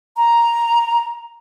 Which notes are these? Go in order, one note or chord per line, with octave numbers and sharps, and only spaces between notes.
A#5